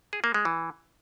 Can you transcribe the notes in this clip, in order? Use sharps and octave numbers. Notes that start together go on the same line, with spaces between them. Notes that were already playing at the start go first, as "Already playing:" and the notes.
G#4
A#3
G#3
E3